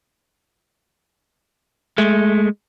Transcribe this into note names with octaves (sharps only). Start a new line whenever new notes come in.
G#3 A3